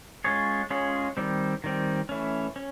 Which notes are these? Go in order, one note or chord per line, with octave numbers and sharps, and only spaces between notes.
G#3 C#4 F4 G#4 C#5
G#3 C#4 F4 G#4 C#5
D#3 G3 C4
D#3 G3 C4
E3 A3 C#4
C#4